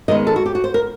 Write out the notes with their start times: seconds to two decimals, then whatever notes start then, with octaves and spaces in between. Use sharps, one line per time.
0.08 D#3 G#3 B3 D#5
0.27 A4
0.36 F#4
0.46 G4
0.55 F#4
0.64 C5
0.74 A#4